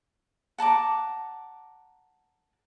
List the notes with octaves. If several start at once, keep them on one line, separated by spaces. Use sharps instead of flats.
F#5 A5 A#5 D6